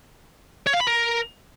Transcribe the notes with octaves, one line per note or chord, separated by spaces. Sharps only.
C#5
F5
B5
A#4